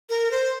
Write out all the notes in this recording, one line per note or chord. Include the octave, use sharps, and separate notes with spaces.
A#4
C5